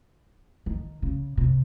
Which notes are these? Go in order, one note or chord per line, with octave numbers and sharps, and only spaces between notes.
D#3
C#3
C3